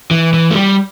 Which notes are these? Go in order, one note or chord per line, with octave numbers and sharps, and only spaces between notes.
E3
E3
A3
G3